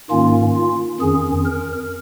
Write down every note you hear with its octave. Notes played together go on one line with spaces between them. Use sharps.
G#2 D#3 A#3 C#4 F4
F4
F2 D#3 C#4 G#4
A#4